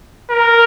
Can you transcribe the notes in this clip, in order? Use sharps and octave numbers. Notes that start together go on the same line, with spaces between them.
A#4